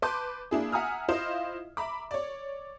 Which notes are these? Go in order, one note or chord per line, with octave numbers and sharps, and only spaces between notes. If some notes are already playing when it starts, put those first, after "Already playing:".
B4 A5 C6 D6 G6
A#3 D4 E4 G#4
E5 F#5 G#5 A#5 D#6 F6
E4 F4 C5 D#5 F5
E5 A#5 B5 D6
C#5 D5